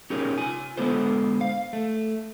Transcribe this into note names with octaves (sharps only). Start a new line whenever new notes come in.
C#4 D#4 G4 G#4 A#4 C#5
F4 G#5
D3 G#3 B3 A4 C5
F5
A3